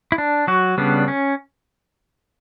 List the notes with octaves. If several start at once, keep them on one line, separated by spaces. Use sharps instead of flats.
E4
D4
F#3 F#4
C#3 G3 B3 D4
C#4